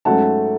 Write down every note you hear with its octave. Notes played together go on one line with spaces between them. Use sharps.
G#2 F#3 A3 C#4 F#5 A5